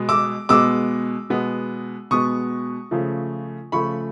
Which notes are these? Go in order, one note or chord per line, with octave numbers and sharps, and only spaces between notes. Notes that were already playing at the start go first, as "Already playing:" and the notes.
Already playing: B2 G#3 B3
D6 E6
B2 G#3 B3 D6 E6
B2 G#3 B3
B2 G#3 B3 C#6 D#6
C#3 F3 A3
C#3 F3 A3 B5 C#6